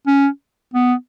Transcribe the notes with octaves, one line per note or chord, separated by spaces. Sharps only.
C#4
B3